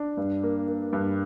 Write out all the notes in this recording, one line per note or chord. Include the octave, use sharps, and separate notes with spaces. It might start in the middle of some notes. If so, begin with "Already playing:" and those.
Already playing: D4
G2
A#3
A#3
G2